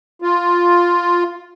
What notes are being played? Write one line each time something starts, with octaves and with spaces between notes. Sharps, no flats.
F4